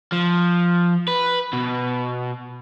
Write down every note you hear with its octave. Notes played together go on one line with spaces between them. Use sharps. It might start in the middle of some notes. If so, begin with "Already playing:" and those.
F3
B4
B2